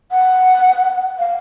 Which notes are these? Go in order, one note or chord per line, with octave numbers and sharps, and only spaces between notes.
F#5
F5